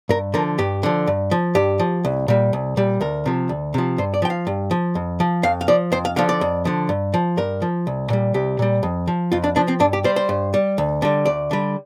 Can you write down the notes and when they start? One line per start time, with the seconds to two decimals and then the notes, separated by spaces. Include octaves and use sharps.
0.09 G2 A#4
0.34 D3 F3 A#4
0.59 G2 G4
0.83 D3 F3
1.07 G2
1.31 F3
1.55 G2 G4
1.79 F3
2.05 C2
2.28 A#2 G3
2.53 C2
2.77 A#2 G3
3.01 D2 A#4
3.26 C3 F3
3.49 D2
3.74 C3 F3
3.98 G2 C5
4.14 D5
4.22 F3 G5
4.30 F5
4.47 G2
4.71 F3
4.95 F2
5.20 F3
5.43 F2 F5
5.61 F5
5.68 F3 D5
5.92 F2 C5
6.05 F5
6.16 D3 F3 F5
6.29 D5
6.41 F2
6.65 D3 F3
6.89 G2
7.14 F3
7.37 G2 A#4
7.62 F3
7.87 C2
8.10 A#2 G3
8.34 C2 G4
8.59 A#2 G3
8.83 F2
9.07 F3
9.32 F2 F4
9.44 D4
9.56 F3 D4
9.68 C4
9.80 G2 D4
9.93 G4
10.04 G3 C5
10.16 C5
10.29 G2
10.54 G3
10.78 D2
11.02 D3 G3
11.26 D2 D5
11.51 D3 G3